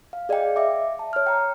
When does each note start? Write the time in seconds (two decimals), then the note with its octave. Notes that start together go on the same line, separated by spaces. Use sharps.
0.13 F5
0.29 G#4 D5 D#5 F5 G5
0.56 E5 D6
0.99 A5
1.13 C#5 F6
1.27 G5 A#5